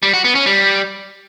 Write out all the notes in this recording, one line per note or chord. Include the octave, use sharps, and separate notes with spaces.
G3
F#4
B3
C#4
G3